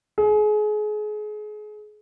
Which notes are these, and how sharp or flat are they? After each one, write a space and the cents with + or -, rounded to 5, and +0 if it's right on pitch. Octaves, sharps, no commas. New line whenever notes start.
G#4 +30